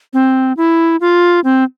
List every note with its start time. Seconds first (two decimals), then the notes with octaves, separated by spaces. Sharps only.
0.13 C4
0.57 E4
1.01 F4
1.44 C4